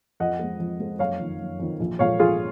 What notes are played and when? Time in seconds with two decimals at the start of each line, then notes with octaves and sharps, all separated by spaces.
0.20 F2 D#5 F#5
0.39 F3 G#3
0.60 F2
0.79 F3 G#3
0.99 F#1 C#5 F5
1.20 F2 D#3
1.40 F#1
1.60 F2 D#3
1.80 A#1
1.99 A#2 F3 G#3 C#5 F5
2.19 A#1 F4 G#4